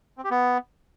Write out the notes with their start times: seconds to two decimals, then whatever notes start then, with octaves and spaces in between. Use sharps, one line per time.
0.17 C4
0.24 G4
0.31 B3